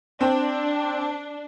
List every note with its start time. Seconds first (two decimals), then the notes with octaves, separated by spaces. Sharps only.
0.21 C4 D4